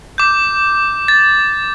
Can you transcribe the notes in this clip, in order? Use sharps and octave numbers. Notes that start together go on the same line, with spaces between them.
D6 G6
A6